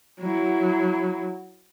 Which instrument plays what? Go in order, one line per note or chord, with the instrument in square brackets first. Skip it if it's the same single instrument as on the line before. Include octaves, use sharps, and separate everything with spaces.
[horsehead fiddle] F#3 E4